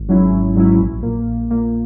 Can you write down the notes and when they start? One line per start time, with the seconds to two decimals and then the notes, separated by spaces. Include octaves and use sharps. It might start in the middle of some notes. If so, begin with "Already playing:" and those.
Already playing: G#1
0.08 G#2 F#3 C#4 E4
0.32 G#1
0.55 G#2 F#3 C#4 E4
0.79 A#1
1.03 A#2 A#3
1.27 A#1
1.51 A#2 A#3